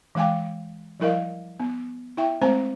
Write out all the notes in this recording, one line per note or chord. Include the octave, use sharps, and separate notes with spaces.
E3 G#3 F5 G5 G#5
F3 G3 E4 A#4 D#5 F5
B3
E4 E5 G5
G#3 A3 C4 C5 G#5 A#5